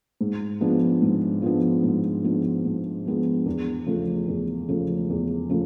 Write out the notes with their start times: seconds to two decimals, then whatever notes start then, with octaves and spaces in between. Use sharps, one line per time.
0.21 G#2
0.61 F3 G#3 B3 D4
1.02 G#2
1.42 F3 G#3 B3 D4
1.83 G#2
2.24 F3 G#3 B3 D4
2.65 G#2
3.05 F3 G#3 B3 D4
3.46 E2
3.86 C#3 F3 A3
4.28 E2
4.68 C#3 F3 A3
5.10 E2
5.49 C#3 F3 A3